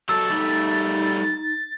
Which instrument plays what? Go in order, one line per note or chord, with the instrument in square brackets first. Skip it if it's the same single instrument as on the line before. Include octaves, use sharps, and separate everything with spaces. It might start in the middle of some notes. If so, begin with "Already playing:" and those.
[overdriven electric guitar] F#3 A4 [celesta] E6 [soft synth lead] A6
[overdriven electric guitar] G3 A3 [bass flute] D#4